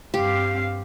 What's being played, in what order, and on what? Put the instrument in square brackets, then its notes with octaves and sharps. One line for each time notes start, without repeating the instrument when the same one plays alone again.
[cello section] G2 C4 F5 [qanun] G4